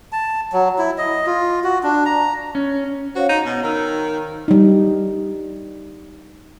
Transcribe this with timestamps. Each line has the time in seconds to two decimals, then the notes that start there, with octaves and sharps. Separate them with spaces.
0.12 A5
0.53 F#3
0.78 E4
0.98 D#5
1.27 F4
1.64 F#4
1.83 D4
2.05 A#5
2.55 C#4
3.15 F#4 C5 C#5 F5
3.29 D#4
3.45 B2
3.63 D#3 A#5 E6
4.48 G3 D#4